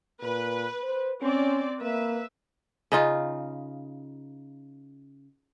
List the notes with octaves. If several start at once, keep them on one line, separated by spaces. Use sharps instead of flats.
A#2 B4
C5
C4 C#4 D5
A#3 B4 E5
C#3 D#4 F4